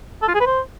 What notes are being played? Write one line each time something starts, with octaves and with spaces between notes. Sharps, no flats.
A4
F4
G#4
B4
C5